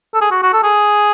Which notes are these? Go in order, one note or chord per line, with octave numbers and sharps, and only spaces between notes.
A4
G#4
F#4
F#4
A4
G#4